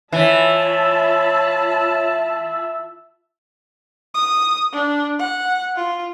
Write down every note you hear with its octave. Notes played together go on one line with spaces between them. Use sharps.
E3 F4 C#5 E5 A5 B5
D#6
D4
F#5
F4